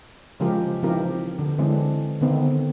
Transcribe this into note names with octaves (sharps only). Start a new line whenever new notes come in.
C#3 F3 G#3 F4 G4 A#4
E3 F3 C4 D#4 G4 A#4
D3
D3 E3 G#3 C4 D4
D3 D#3 B3 C4 D#4